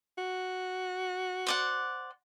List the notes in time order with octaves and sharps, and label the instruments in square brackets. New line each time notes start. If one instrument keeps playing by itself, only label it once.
[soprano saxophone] F#4
[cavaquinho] C5 D5 F#5